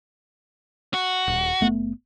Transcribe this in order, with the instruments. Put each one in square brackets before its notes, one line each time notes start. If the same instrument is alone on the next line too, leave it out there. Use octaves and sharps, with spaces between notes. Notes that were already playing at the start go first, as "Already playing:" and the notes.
[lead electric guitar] F#4
[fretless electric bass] D#1
F#1 A3 B3